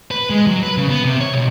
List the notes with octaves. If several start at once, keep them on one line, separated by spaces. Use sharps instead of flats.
B4
G#3
F#3
B4
C#3
B3
C3
C#5
B1